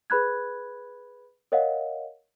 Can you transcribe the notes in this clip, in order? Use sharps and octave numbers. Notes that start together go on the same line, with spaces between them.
G#4 B4 B5 F#6 G#6
A#4 C#5 D#5 F5 F#5